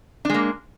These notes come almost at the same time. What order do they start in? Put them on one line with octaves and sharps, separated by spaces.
D4 G#3 A#3